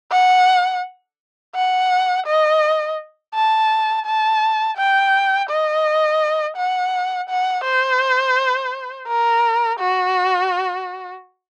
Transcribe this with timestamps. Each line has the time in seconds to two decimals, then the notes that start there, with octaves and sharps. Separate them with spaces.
0.12 F#5
1.55 F#5
2.27 D#5
3.35 A5
4.06 A5
4.77 G5
5.50 D#5
6.57 F#5
7.29 F#5
7.65 C5
9.08 A#4
9.80 F#4